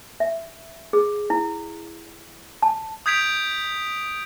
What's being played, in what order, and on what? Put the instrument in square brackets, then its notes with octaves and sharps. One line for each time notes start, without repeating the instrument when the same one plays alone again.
[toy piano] E5
G#4
E4
A5
[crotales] D#6 G6 G#6 B6 D7 F7